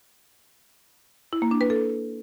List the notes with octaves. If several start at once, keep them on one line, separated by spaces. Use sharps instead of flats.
E4
A#3
D4
B4
A4